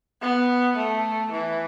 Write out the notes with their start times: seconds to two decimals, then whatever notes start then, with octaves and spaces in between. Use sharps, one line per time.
0.22 B3
0.76 A3
1.31 E3